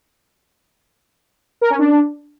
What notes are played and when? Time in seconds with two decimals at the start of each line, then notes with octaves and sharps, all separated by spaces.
1.61 A#4
1.70 C#4
1.79 D4